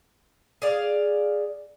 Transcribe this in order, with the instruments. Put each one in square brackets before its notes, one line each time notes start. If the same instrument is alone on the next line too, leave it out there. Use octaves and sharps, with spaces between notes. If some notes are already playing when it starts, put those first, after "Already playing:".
[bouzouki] G#4 D5 F5